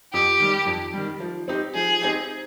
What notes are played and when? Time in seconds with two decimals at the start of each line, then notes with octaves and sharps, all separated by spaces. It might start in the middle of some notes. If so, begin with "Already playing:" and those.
0.13 F2 G4
0.40 D#3 G3
0.66 F2
0.94 D#3 G3
1.20 F3
1.48 C4 D#4 G4
1.75 F3 G#4
2.01 C4 D#4 G4